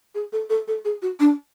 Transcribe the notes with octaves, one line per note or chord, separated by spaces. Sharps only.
G#4
A4
A4
A4
G#4
F#4
D4